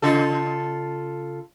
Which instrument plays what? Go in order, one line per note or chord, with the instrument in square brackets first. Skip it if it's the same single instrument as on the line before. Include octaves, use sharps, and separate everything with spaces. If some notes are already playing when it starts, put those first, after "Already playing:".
[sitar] C#3 F4 A4